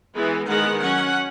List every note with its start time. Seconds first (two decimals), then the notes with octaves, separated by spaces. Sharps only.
0.15 E3 G#3 B3
0.48 D#3 G#3 B3 F#5
0.82 F#3 C#4 F#5